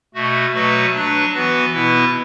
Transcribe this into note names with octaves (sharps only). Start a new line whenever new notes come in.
B2 A3 F#4
B2 F#3 A3 F#4 B4
F#3 D4 B4
E3 B3 F#4 B4
B2 B3 E4 B4